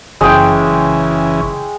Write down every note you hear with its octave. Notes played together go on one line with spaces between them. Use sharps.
F#1 C#3 E3 G#3 G5